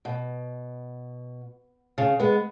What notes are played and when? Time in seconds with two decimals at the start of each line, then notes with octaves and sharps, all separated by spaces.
0.05 B2
1.98 C#3
2.20 G#3 B3